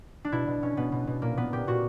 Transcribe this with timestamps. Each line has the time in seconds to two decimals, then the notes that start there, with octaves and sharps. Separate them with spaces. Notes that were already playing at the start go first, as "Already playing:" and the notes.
0.25 D4
0.32 B2 E4
0.47 B2
0.62 B2 C#4
0.77 B2 B3
0.92 B2
1.07 B2
1.22 A#2 A#3
1.37 A#2 B3
1.53 A#2 G4
1.67 A#2 F#4